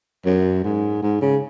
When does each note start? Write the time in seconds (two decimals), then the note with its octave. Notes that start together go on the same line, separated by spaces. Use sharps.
0.26 F#2
0.64 G#2
1.02 G#2
1.21 C#3